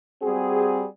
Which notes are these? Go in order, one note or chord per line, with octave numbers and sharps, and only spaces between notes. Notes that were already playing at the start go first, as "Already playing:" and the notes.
G3 C4 F#4 G#4